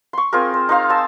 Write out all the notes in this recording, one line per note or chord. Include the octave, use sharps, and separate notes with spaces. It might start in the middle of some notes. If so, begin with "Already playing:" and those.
C6 C#6
C4 F4 G#4 A#4
C5
D#4 C5 F5 A#5
G#5 A5 E6